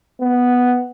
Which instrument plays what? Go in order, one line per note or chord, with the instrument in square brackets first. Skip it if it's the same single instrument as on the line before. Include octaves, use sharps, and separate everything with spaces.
[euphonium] B3